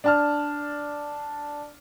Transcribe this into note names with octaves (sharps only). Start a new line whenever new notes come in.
D4 A5 F6